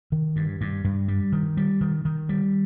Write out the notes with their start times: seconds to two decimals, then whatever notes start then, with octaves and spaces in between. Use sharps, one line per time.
0.12 D#3
0.36 G2
0.61 G2
0.84 G2
1.08 G3
1.32 D#3
1.57 G3
1.81 D#3
2.05 D#3
2.29 G3